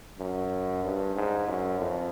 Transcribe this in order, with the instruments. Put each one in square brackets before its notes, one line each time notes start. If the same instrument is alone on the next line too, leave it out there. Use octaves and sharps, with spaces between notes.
[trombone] F#2
G2
G#2
F#2
F2